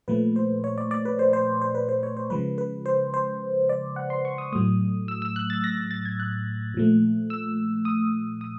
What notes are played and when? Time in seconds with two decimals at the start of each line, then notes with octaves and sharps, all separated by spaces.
0.08 A#2 F3 A3 B4
0.36 C5
0.64 C#5
0.78 D5
0.91 D5
1.05 B4
1.19 C5
1.33 C5
1.61 C5
1.75 B4
1.89 C5
2.03 C#5
2.17 C5
2.30 C#3 F3 G#3 B4
2.58 B4
2.86 C5
3.14 C5
3.69 D5
3.96 F#5
4.10 C6
4.25 C#6
4.38 D#6
4.52 A2 F#3 A3 D#6
5.08 E6
5.22 E6
5.36 F#6
5.50 A6
5.64 A#6
5.91 A6
6.05 G#6
6.20 F#6
6.74 A#2 F3 A3
7.30 E6
7.85 D#6
8.41 D#6